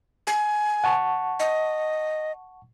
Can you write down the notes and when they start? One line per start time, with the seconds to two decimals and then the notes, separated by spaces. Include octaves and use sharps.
0.27 G#5
0.84 F#5 A5 C#6
1.40 D#5